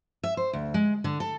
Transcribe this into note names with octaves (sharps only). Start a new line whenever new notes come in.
E5
C5
D2
G#3
D3
A4